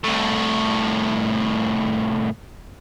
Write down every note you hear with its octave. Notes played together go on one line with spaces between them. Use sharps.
C2 A2